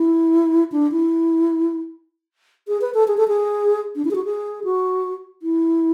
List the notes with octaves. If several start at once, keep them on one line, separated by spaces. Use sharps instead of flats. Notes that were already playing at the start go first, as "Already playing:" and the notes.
Already playing: E4
D4
E4
G#4
B4
A4
G#4
A4
G#4
D4
E4
G#4
F#4
G#4
F#4
E4